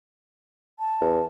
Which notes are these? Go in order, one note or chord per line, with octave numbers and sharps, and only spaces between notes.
A5
E2